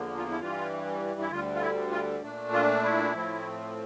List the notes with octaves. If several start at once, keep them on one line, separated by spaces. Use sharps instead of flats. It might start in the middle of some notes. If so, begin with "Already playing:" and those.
Already playing: E2 D3 F3 A#3
F4
E4
G2 E3 G3 F4
E4
D2 D3 G3 F4
F4
E4
F4
A#2 A3 D4
F4
E4
A2 F3 A3 C4